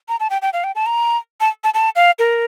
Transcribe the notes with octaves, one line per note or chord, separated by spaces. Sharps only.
A#5
A5
G5
G5
F5
G5
A5
A#5
A5
A5
A5
F5
A#4